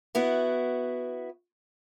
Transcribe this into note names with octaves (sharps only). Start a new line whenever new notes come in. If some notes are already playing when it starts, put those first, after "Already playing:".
B3 E4 F#4